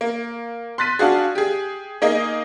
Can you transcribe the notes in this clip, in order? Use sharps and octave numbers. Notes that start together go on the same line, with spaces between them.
A#3
C6 F#6 A6 B6 D#7
D4 F4 F#4 G#4
G4 G#4
A#3 D#4 G#4 D#5